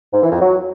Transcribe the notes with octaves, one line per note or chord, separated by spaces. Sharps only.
G#2
E3
F2
F#3